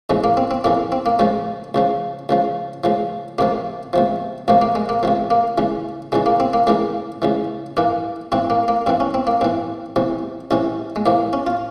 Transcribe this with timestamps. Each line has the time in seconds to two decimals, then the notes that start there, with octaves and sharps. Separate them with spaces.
0.10 F2 C#3 E3 G#3
0.24 A#3
0.37 C4
0.51 C4
0.64 F2 C#3 E3 A#3
0.92 C4
1.06 A#3
1.19 C#2 C#3 F3 G#3
1.74 C#2 C#3 F3
2.29 C#2 C#3 F3
2.84 C#2 C#3 F3
3.38 C#2 C3 F3 A#3
3.93 C#2 C3 F3
4.48 C#2 C3 F3 A#3
4.62 A#3
4.75 G#3
4.89 A#3
5.03 C#2 C3 F3
5.30 A#3
5.58 C#2 C#3 E3
6.12 C#2 C#3 E3 G#3
6.26 A#3
6.40 C4
6.53 A#3
6.67 C#2 C#3 E3 A#3
7.22 C#2 C#3 E3
7.77 G2 E3 A#3
8.32 G2 E3 C4
8.50 A#3
8.68 A#3
8.86 G2 E3 C4
9.00 C#4
9.14 C4
9.27 A#3
9.41 G2 E3 C4
9.96 C2 C3 E3
10.51 C2 C3 E3 C#4
10.96 G#3
11.06 C2 C3 E3 A#3
11.33 C#4
11.47 F4